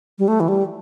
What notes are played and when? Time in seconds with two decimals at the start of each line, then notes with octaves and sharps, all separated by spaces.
0.19 G3
0.28 A3
0.40 E3
0.48 G3